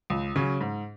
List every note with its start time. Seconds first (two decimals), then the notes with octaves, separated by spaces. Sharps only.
0.10 C#2
0.35 C#3 F#3 C#4
0.61 G#2